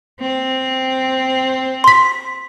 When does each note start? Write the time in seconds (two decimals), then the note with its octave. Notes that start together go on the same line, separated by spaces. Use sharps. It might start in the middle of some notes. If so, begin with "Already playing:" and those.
0.20 C4
1.84 C6 B6